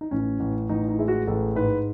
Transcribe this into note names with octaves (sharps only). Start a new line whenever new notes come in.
D#4
A1 C#4
A1
A1 D#4
D#4
G#3 E4
F#4
A1 A4
G#2 B4